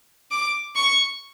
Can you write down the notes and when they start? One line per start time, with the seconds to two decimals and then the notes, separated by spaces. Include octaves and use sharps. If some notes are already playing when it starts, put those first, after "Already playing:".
0.31 D6
0.76 C#6